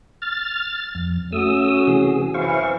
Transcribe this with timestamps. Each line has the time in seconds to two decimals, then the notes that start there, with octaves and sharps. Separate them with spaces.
0.22 F6 A6
0.95 F2
1.32 A3 C#4 F#4 D#6 E6
1.87 C3 E3 G#4
2.34 F#2 E3 C5 F5 C#6